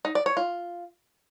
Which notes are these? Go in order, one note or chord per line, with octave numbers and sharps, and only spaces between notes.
D#4
D5
C#5
F4